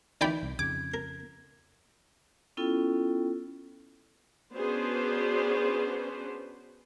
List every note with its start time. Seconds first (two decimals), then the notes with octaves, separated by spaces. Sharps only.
0.21 D#3 E3 D5 G5 B5
0.43 C2
0.59 F2 C#3 D6 G#6
0.94 A#4
2.57 B3 C#4 E4 F4 A4 G5
4.56 B3 C#4 D4 F#4 G#4 C5